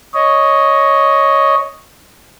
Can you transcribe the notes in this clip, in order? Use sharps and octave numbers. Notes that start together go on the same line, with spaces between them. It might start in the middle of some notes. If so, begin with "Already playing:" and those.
C#5 D#5